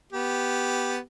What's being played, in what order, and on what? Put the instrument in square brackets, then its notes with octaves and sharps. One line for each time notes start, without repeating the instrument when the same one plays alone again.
[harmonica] B3 G4